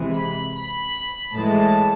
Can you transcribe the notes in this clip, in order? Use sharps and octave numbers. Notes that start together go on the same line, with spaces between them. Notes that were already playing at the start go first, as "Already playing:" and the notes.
Already playing: C3 E3 G#3
B5
B5
A2 E3 G#3 A5